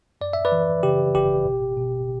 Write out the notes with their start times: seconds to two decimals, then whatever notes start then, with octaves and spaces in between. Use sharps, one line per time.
0.21 F#2 D5
0.33 E5
0.45 B4 D5
0.52 E3
0.83 C#3 G4
1.14 G1 G4
1.46 B2
1.77 B2